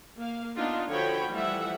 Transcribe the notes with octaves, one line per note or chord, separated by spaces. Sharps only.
A#3 F5
B3 D4 D#4 F4
D3 F3 F#4 C#5 G5 B5
E3 F3 G3 A3 E5 F#5